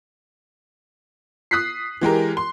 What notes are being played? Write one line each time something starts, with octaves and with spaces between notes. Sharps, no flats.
D#6 F#6 B6 C7
E3 G#3 G4 A#4
C6